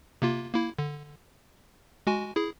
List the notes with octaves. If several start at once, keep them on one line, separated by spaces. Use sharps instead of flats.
C3 A#3 F4
A#3 E4
D3
G#3 F#4 G#5
E4 G#4